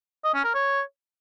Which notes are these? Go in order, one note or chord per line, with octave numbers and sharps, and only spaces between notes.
D#5
C#4
A#4
C#5